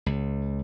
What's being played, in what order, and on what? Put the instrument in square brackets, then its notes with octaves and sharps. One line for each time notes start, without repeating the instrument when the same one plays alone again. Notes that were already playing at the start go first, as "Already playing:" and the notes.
[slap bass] C#2